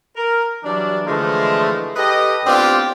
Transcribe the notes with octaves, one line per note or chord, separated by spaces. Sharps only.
A#4
E3 F#3 G3 D4
D3 E3 F3 G#3 A3
G4 A4 B4 D#5
A2 B3 C4 D4 F4 G4